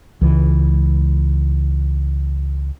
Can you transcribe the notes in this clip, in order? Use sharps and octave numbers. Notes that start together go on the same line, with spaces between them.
C#2 E3